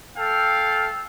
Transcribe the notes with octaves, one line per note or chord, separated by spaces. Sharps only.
A4 F5 G5